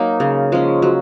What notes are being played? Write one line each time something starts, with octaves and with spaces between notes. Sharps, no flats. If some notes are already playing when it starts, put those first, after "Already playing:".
Already playing: F#3 A#3 D#4
C#3
F3 G#3 C#4
F#3